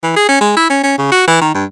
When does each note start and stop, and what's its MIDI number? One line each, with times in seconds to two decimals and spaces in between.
0.04 0.16 52
0.16 0.25 68
0.29 0.38 61
0.41 0.53 56
0.57 0.68 64
0.70 0.81 61
0.84 0.98 61
0.98 1.07 49
1.12 1.24 66
1.27 1.38 52
1.41 1.50 51
1.54 1.65 43